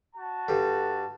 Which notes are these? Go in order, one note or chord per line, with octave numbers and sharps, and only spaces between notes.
F#4 A5
G2 G3 A4